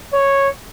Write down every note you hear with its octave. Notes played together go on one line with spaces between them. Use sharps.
C#5